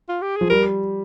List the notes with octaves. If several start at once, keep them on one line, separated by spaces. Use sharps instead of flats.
F4
G4
F3 G#4
G3 A#4